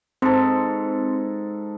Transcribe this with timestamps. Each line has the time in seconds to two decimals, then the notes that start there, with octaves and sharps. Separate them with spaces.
0.22 G#2 C4 A4